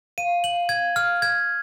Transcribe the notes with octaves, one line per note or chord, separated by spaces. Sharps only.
F5 D#7
F#7
G#6
F6
G#6